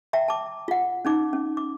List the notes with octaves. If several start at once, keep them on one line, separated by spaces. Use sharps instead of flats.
E5 G5 A#5
A5 D6
F4 F#5
C#4 D#4 D6
C#4
D6